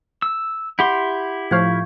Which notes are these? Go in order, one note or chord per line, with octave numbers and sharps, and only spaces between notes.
E6
E4 G4 F#5 B5 C6 G6
A2 F3 F5 C#6 G6 G#6